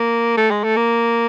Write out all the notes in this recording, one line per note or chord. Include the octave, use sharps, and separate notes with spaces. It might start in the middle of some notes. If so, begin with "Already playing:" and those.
Already playing: A#3
A3
G#3
A3
A#3